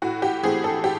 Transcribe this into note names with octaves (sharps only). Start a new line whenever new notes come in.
A2 F#4
G4
E3 A3 C4 G#4
A4
A2 G4